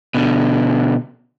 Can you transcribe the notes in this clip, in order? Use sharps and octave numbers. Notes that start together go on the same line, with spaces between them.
B2 D3